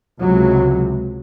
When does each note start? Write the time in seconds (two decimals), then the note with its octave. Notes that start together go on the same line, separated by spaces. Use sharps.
0.21 C#2 C3 F#3